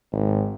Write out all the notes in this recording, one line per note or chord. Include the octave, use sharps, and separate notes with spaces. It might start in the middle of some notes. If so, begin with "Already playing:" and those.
G#1